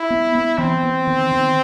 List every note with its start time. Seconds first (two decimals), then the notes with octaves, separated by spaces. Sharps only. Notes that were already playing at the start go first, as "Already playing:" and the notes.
Already playing: E4
0.10 B3
0.35 B3
0.58 E3 C4
0.83 B3
1.07 D#3
1.32 D#3